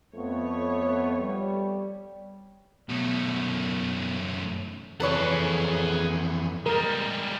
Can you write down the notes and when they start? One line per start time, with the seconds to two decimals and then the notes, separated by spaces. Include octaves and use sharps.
0.16 F2 A3 B3 C#5
1.21 G3
2.89 F#2 B2 A3
5.00 F2 E3 G#4 A4 B4 C#5 F#5
6.66 G3 G#3 A#4